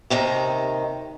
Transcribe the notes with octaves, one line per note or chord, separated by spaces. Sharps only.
D#2 C3 D#3 A#5